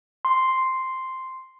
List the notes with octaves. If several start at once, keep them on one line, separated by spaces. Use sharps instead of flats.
C6